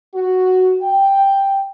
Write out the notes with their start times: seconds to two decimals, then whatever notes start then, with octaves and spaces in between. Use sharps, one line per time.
0.15 F#4
0.82 G5